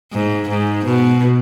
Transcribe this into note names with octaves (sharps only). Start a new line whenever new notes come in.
G#2
G#2
B2